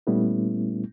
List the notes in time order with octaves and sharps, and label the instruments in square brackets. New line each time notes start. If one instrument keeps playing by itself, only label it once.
[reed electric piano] A#2 G3 A3 B3 C#4 E4